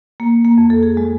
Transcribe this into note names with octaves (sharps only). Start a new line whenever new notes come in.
A#3
A#3
F2
A4
G#4
G#3